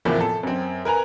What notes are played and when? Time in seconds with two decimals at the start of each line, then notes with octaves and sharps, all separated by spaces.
0.05 E2 A2 C3 E3 F3 A#3
0.20 A4
0.43 F#2 C4
0.85 A#4 B4 G#5 A#5